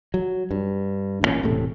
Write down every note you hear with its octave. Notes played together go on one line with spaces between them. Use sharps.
F#3
G2
A1 G2 A#2 C#4
E1 A2 C3 A3